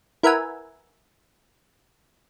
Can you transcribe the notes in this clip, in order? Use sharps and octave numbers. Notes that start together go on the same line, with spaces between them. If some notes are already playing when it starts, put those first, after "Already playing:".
E4 A#4 B4 E5 F#5 G#5